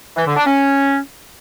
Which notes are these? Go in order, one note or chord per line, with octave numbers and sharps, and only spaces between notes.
E3
D3
D4
C#4